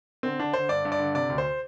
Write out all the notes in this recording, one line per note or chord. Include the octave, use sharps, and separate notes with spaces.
D3 C4
D3 D4
D3 C5
G2 D5
G2
D5
D3
C3 D5
D2
C5